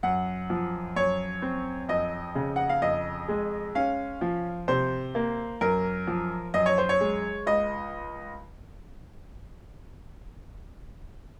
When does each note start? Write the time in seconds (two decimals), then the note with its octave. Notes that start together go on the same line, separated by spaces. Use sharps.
0.03 F#2 F#5
0.50 F3
0.96 F#2 C#5
1.42 C4
1.89 F2 D#5
2.35 C#3
2.56 F#5
2.69 F5
2.82 F2 D#5
3.28 G#3
3.75 C#4 F5
4.21 F3
4.68 C3 C5
5.15 A#3
5.61 F#2 A#4
6.07 F3
6.54 F#2 D#5
6.66 C#5
6.78 C5
6.89 C#5
7.01 G#3
7.47 C#2 D#5